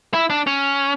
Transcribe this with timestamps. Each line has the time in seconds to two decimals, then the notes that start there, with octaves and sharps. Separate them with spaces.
0.13 E4
0.30 D4
0.47 C#4